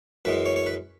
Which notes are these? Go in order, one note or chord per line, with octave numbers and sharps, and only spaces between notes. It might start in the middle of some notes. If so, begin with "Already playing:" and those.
F#2 E3 G#3 B4
C#5
C#5
B4